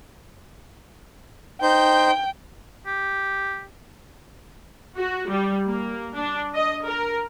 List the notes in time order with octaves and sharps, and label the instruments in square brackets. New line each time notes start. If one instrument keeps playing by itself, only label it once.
[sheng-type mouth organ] D#4 C5 G6 [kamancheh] G5
[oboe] G4
[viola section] F#4
G3
A#3
D4
D#5
A#4